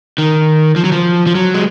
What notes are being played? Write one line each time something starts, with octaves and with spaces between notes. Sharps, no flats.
D#3
F3
F#3
F3
F3
F#3
G#3